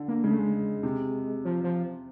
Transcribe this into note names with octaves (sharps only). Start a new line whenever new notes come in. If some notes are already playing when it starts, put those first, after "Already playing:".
Already playing: D3
A#3
C#3 G#3
A3
G#3
C3
F3
F3